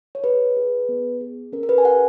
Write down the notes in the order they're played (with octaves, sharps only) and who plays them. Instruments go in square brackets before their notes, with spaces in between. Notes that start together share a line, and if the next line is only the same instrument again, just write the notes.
[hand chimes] C#5
G#4 B4
G#4
B3
G#4
C#4 A#4
A#4
B4
G#5
G#4 F#5